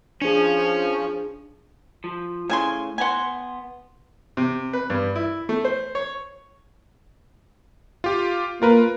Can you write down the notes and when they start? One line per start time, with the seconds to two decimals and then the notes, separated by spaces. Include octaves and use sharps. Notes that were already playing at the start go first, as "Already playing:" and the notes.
0.22 F3 C#4 D4 G#4
2.04 F3
2.50 A2 C#3 G#5 C6
2.98 B3 B4 F#5 G#5 C6
4.37 C3
4.73 B4
4.90 G2
5.16 E4
5.49 A3
5.65 C5
5.95 C#5
8.04 F4 G4
8.62 A#3 F4 A#4 B4